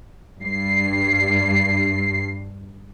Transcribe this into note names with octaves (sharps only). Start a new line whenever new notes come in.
G2 C7